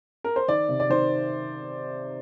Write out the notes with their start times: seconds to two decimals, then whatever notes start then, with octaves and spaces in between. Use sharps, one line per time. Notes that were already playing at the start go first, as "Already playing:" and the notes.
0.24 A#4
0.36 C5
0.48 D#3 D5
0.69 C3
0.80 D5
0.90 D#3 C5